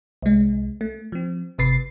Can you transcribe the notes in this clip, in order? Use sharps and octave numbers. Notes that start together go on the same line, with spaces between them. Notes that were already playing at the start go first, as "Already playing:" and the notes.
C2 G#3
A3
F3 C4
G1 C3 B4 A6 C7